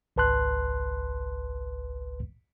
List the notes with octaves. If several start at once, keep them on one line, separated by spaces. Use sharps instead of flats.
G#1 C#2 B4 A5 C6 F#6